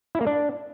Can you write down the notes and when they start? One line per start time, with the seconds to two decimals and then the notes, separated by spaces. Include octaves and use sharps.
0.15 E4
0.21 A#3
0.27 D4